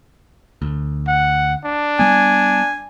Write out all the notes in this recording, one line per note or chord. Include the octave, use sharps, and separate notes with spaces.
D2
F#5
D4
G3 B3 G#5